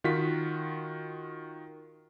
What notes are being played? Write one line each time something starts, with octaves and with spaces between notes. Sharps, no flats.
D#3 F4 F#4 B6